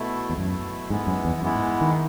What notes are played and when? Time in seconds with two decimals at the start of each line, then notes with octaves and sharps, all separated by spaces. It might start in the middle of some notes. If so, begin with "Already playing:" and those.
Already playing: B2 A3 E4
0.29 E2
0.38 F#2 B2 A3 E4
0.90 G#2 E3 G#3 B3 E4
1.07 F#2
1.25 E2
1.42 F#2 E3 G#3 B3 E4
1.55 G#2
1.81 D#3